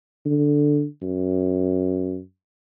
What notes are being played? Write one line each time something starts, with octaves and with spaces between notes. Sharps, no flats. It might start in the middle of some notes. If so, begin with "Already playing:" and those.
D3
F#2